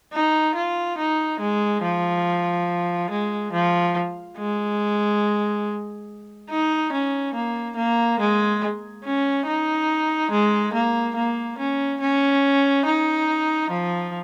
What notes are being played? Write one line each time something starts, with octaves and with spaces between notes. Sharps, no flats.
D#4
F4
D#4
G#3
F3
G#3
F3
G#3
D#4
C#4
A#3
A#3
G#3
C#4
D#4
G#3
A#3
A#3
C#4
C#4
D#4
F3